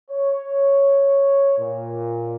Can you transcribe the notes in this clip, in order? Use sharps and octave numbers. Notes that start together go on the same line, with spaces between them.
C#5
A#2